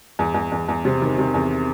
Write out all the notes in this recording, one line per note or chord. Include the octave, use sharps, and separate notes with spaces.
E2
E2
E2
E2
C3
D#3
C3
E2